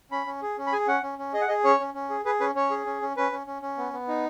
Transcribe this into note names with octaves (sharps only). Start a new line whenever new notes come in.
C#4 B5
C#4
G#4
C#4
B5
G#4 G#5
C#4 F#5
C#4
C#4
G#4 D#5
F#5
G#4 D#5
C#4 C#5
C#4
C#4
G#4
G#4 B4
C#4 B4
C#4 C#5
G#4
C#4
C#4
C#4 B4
C#4
C#4
C#4
B3
B3
D#4